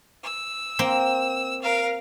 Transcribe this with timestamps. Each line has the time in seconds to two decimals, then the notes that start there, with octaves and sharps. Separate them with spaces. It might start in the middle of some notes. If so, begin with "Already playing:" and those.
0.24 E6
0.79 A#3 C4
1.63 A#4 F5